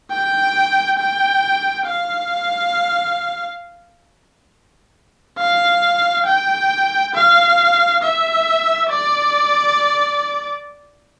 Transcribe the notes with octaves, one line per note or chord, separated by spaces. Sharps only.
G5
G5
F5
F5
G5
F5
E5
D5